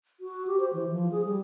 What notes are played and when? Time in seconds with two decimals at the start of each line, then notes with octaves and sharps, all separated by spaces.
0.20 F#4
0.47 G4
0.60 C5
0.73 E3
0.92 F3
1.11 G#4
1.25 G3